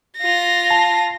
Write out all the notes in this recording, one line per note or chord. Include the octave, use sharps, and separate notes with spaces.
F4 A#6
A5